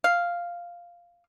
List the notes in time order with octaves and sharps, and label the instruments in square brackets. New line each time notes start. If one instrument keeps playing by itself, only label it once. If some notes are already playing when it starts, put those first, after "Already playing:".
[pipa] F5